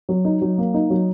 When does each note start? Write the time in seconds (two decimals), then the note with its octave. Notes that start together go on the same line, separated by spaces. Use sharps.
0.09 F#3
0.25 D#4
0.42 F#3
0.58 A#3
0.74 D#4
0.90 F#3